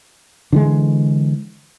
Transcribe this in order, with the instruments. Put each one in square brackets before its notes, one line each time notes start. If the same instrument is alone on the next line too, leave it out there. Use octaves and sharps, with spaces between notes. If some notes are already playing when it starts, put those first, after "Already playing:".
[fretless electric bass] D3 E3 G#3